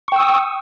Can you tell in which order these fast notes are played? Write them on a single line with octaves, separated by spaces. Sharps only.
C#6 G5 E6 D#6